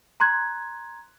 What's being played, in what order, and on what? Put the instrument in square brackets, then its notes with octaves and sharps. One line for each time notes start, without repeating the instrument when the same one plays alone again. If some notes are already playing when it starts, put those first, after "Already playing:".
[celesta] A#5 C6 F#6 G#6